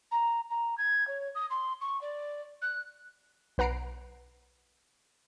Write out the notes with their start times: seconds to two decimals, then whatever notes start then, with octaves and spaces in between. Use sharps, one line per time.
0.11 A#5
0.50 A#5
0.77 G#6
1.07 C#5
1.35 D#6
1.50 C6
1.81 C#6
2.01 D5
2.62 F#6
3.58 B1 B4 F#5 A#5 C7 D7